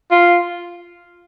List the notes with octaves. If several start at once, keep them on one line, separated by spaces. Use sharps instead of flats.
F4